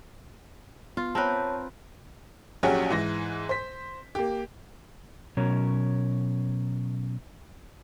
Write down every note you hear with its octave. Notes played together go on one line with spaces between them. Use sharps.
B3 F4
C4 A#4 B4 C#5 A5
A#1 F#3 C#4 G4 G#4 F#5
G#2 E3 A#6
C5 B6
A#3 G4
B2 F#3 C#4 A#4 C#5